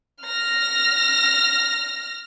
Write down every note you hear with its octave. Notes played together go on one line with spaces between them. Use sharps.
F6 A#6